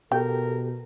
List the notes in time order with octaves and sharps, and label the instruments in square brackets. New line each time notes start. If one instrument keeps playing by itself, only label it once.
[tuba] B2 [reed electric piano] G4 A4 [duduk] A#4 [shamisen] G5